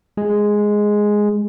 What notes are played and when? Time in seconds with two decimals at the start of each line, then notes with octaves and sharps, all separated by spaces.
0.17 G#3